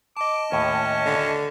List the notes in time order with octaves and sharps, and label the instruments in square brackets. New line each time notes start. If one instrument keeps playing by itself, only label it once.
[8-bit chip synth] D#5 A5 [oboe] D6
[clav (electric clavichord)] D#2 A2 [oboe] C#4
[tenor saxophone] D3